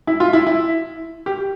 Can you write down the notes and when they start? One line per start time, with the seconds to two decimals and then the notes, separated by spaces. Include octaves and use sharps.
0.07 E4
0.20 F4
0.33 E4
0.47 E4
1.26 G4